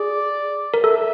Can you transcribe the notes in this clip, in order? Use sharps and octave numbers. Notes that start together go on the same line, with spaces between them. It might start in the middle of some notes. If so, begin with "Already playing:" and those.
Already playing: G#4 D5
A#4
A4 E5